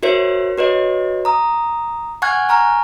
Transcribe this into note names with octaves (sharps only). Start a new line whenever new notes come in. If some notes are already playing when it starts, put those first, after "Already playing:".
F#4 A#4 C5 C#5 E5
F#4 B4 C#5 D#5
A#5 D#6
F#5 G#5 C#6 F6 F#6 G#6
G#5 A#5 C#6 F6